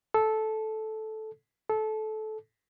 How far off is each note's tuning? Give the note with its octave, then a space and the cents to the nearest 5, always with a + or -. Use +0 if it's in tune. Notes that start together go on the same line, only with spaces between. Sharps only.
A4 -10
A4 -20